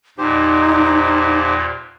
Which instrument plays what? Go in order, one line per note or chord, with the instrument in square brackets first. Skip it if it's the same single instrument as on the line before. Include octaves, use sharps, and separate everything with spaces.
[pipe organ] E2 A#2 [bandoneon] F3 G4 C5 [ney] D#4